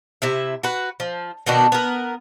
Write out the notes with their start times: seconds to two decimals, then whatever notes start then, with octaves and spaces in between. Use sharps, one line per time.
0.22 C3 E4 E5
0.63 F#4 B4
1.00 F3
1.46 B2 D#3 D4 F#4
1.72 B3 A#4